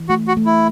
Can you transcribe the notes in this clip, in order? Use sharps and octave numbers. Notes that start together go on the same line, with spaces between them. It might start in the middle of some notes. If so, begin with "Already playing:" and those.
Already playing: E3
A3 F#4
F#4
A3
E4